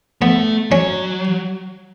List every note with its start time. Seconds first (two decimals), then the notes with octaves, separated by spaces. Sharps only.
0.21 A3 B3
0.71 F#3 C#4